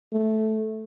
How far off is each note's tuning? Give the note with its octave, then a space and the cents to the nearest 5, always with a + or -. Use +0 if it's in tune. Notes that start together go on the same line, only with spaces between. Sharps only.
A3 -10